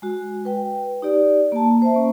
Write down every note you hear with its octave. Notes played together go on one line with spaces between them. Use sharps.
G#3 F#4
B4 G5
D#4 G4 D5
A#3 A5
C5 E5
A#3 C#4